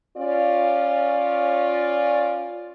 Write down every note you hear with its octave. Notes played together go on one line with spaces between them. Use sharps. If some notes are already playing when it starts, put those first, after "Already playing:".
C#4 F4 D5